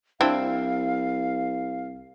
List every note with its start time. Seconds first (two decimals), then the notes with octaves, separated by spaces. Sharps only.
0.21 C2 C4 D4 E4 F5